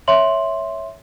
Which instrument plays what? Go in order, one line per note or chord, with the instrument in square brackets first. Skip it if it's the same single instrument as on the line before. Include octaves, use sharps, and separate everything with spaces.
[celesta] C#5 E5 C6 F#7